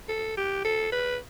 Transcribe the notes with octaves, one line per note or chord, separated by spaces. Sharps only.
A4
G4
A4
B4